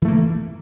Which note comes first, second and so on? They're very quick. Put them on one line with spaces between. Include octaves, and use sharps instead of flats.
E3 A3 A#3